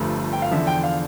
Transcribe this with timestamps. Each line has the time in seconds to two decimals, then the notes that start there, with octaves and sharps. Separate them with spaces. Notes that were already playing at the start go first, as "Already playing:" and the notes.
Already playing: G1 G2 F3 A3
0.33 G5
0.42 F5
0.51 E2 D3 F3 E5
0.67 G5
0.84 F5